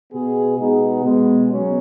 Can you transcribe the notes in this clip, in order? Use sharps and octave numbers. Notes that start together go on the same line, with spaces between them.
B2 B3 G#4
B2 G#3 B3 D#4 G#4
B2 G#3 B3
B2 F#3 C#4